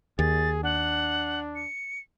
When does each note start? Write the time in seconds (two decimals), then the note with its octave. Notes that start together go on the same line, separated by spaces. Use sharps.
0.19 D#2 G#4 A6
0.63 D4 F#5
1.56 C#7